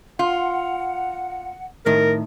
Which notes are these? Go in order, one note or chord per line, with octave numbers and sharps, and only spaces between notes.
F4 F#5
A2 D#3 A#4